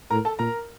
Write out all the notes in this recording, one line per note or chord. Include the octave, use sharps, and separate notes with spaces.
A2 A#4 A#5
A4 A5
A#2 A#4 A#5